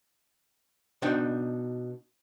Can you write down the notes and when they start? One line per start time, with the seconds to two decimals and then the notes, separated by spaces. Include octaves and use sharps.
1.02 B2 D4 D#4 F#5 G5